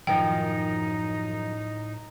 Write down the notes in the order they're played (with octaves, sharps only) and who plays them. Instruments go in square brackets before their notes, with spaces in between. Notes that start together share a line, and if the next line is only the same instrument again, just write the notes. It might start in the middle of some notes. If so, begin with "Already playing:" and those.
[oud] F#2 D#3 F3 [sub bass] A2 [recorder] D#4 [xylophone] G5